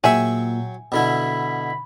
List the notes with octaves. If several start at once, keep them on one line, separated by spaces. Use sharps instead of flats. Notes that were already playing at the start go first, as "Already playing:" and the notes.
A#2 F#3 G#4 E5 G5 C#6
B2 D3 E4 B5